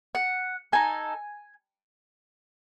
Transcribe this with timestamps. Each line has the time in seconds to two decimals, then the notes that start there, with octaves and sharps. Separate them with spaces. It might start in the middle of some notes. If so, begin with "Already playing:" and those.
0.15 F#5
0.72 D#4 A4 G#5